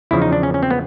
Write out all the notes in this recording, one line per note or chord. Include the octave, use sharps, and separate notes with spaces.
E2 C#3 F3 E4
D#4
D4
C#4
C#4
C4
B3